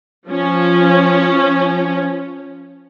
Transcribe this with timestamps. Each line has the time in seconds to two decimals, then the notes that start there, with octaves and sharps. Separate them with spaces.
0.27 F3 C#4